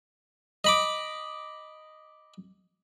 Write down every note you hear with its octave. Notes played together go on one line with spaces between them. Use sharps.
D#5 B5 D6